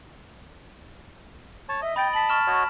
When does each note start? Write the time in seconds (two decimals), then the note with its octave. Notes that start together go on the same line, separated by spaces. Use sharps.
1.69 C#5 A5
1.81 D#5 E5
1.96 G5 B5 A6 D7
2.13 A5 B6 F#7
2.29 C#6 F6 E7
2.47 F#4 C#5 D#5